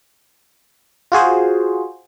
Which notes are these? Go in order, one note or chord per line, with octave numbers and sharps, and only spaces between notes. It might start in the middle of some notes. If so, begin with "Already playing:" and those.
F4 F#4 G#4 C5